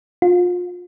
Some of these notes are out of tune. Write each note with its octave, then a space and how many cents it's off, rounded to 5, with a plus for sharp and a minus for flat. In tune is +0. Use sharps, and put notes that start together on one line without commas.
F4 +30